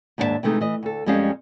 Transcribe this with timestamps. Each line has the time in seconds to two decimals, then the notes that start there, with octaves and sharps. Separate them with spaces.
0.18 D#2 G#2 D4 F4 E5 A5
0.43 C3 E3 G#3 A3 C4 D#4
0.61 E3 D#5
0.83 D2 A4
1.06 F2 G3 G#3 C#4 G4 F5